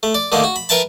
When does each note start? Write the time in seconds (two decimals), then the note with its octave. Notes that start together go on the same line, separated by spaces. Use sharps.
0.03 A3
0.15 D5
0.32 D3 D#3 A3 A#3
0.44 F#4
0.56 B5
0.69 A#4 B4 E5 G5 A5 B5